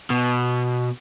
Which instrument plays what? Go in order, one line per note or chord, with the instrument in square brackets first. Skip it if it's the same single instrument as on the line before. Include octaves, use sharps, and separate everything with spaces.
[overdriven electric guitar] B2